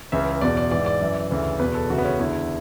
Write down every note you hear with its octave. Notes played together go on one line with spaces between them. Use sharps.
C#2 C#3 E3 E5
E2 B2 D5
D5
G#2 E3 D5
D5
F#2 E3
D2 C#3 E3
E2 B2 B4
A4
D2 C#3 E3 F#4
B3
C#4
E2 D3 E4